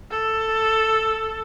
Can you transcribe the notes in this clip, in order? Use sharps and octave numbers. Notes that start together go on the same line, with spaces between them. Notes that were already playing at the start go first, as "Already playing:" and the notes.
A4